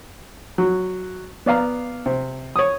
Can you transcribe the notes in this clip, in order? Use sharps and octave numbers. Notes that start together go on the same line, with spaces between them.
F#3
B3 D5 F5 A#5
C3
C#5 D#6